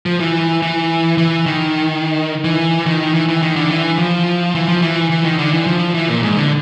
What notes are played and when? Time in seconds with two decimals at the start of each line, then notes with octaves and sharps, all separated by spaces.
0.06 F3
0.20 E3
0.62 E3
1.18 E3
1.46 D#3
2.45 E3
2.86 D#3
3.15 E3
3.28 E3
3.42 D#3
3.56 D3
3.70 E3
3.99 F3
4.55 E3
4.69 F3
4.82 E3
5.10 E3
5.25 D#3
5.39 D3
5.53 E3
5.67 F3
5.94 E3
6.08 A#2
6.23 G#2
6.37 D3